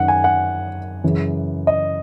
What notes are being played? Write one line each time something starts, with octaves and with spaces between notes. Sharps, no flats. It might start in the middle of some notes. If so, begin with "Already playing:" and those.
Already playing: F#2 D#3 F#5
G#5
F#5
F#2 C#3 E3
D#5